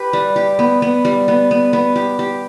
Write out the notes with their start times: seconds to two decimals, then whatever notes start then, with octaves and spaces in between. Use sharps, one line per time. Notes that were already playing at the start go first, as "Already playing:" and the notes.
Already playing: G4 B4
0.13 G3
0.36 G4
0.59 B3
0.82 B3
1.05 G3
1.28 B3
1.51 B3
1.73 B3
1.96 G4
2.19 G4